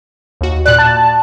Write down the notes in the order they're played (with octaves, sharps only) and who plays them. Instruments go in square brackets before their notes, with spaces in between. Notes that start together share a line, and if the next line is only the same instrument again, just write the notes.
[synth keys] D#2 F#4
[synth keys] A#2 D5 [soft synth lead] F#6
[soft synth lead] A5